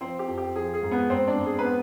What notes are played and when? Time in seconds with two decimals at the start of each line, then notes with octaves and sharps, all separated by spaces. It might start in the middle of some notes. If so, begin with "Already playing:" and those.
0.01 F3 C4 C5
0.19 G4
0.28 F2
0.38 G4
0.56 F3 G#4
0.74 G#4
0.82 G#2
0.91 B3 B4
1.10 G#2 C4 C5
1.28 D4 D5
1.37 G#2
1.46 G#4
1.59 B4
1.64 B3